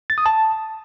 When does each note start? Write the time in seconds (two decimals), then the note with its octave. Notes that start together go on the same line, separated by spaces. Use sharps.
0.10 A6
0.18 D#6
0.26 A5